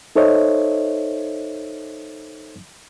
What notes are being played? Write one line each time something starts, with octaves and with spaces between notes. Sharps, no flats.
D#4 A4 C5 C#5 D#5 E5